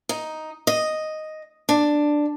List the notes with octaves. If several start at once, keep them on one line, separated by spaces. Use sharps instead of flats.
D#4
D#5
D4